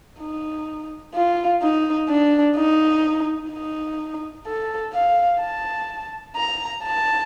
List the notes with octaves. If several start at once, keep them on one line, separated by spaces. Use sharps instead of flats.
D#4
F4
D#4
D4
D#4
D#4
A4
F5
A5
A#5
A5